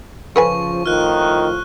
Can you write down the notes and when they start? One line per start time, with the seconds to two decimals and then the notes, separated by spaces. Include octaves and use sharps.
0.36 C#3 F3 A4 B4 G#5 C#6
0.86 A2 D#3 F3 F4 F6 F#6